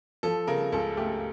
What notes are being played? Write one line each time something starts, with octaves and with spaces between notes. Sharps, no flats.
F3 A4
C#3 A#4
C#2 A4
A3 G4